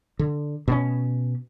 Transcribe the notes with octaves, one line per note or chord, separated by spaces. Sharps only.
D3
B2 C4 C#4